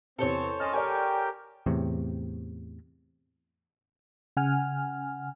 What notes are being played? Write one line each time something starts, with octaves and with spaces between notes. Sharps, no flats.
E2 C3 C4 A4 C5 C#5
C#4 D#5 A5 C6 F6
G4 A#4 D5 G5 G#5
E2 A2 C3
C#3 F#5 G#5 F6